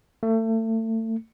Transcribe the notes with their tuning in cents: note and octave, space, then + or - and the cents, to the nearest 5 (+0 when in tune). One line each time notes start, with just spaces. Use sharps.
A3 +30